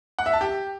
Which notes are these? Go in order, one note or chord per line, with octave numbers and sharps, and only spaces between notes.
F#5
E5
A5
G4